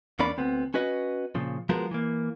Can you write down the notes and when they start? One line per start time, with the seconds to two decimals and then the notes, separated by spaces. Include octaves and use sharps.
0.19 E2 A#3 C#4 D4 D5 B5
0.38 D2 B3 C4
0.74 C#4 F#4 B4 D#5
1.35 A#2 C#3 F3
1.69 F3 G#3 B3 F4 F#4 A#4
1.91 E3 A#3